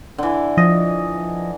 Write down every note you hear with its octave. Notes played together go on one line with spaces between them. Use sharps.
D3 E3
F3 D#5